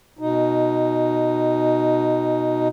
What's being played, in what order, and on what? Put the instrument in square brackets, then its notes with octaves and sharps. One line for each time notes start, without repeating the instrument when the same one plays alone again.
[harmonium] B2 D#4